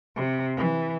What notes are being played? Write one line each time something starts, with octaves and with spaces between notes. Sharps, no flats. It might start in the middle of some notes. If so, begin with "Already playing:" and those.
C3
E3